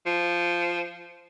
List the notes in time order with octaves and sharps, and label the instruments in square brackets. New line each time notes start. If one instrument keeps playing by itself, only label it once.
[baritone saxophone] F3